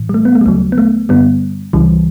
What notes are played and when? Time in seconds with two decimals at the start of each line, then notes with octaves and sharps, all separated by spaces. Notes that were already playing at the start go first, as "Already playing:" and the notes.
Already playing: A2 E3
0.09 G3
0.14 A3
0.25 B3
0.35 A3
0.41 G3
0.46 D2 C#3 F#3 A3
0.72 B3
0.78 A3
1.09 G2 D3 G3 B3
1.73 C#2 C#3 E3 G3